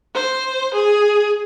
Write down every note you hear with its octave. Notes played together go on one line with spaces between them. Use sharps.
C5
G#4